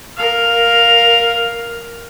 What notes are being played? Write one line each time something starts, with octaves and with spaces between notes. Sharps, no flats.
A#4 F5